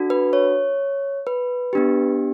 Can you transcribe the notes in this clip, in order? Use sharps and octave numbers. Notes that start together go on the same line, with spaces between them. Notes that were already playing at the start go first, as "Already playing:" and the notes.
Already playing: D4 F#4 A4
B4
C#5
B4
B3 D4 G4